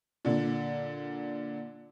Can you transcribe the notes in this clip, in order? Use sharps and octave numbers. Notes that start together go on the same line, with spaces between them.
A#2 D3